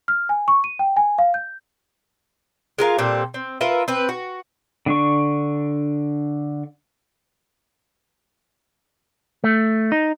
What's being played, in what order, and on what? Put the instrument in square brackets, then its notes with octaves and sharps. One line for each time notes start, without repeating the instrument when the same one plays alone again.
[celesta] F6
G#5
C#6
D#7
G5
G#5
F5
G6
[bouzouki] G#3 F4 A#4 F5
A#2 G3 C4 A4
C4
F4 A#4 B4 E5
C4 B4
F#4
[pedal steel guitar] D3 D4 C#6
[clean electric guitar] A3
D#4